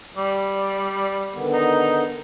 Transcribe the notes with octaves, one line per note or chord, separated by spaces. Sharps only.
G3
D5
D3 D#3 B3
D#4